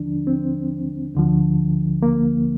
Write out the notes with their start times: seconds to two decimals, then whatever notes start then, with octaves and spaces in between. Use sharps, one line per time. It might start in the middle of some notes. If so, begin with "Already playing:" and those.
Already playing: D#2 D3 F3 D4
0.27 C4
1.15 D2 D3 F3
2.02 A#3